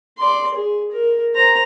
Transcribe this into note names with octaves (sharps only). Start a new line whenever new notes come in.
D5 C6
G#4
A#4
C5 A#5